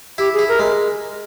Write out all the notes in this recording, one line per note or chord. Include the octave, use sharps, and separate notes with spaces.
E4 G4
G#4
E4
A#4
G#3